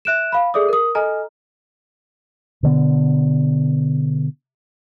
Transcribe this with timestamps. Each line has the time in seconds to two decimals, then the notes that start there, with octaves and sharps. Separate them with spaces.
0.05 E5 F#6 D7 E7
0.32 F5 B5
0.54 G#4 A4 D5 E5 D6 D#6
0.69 A#4 D#6
0.95 A4 D#5 G#5 A#5 F6
2.63 B2 D3 B3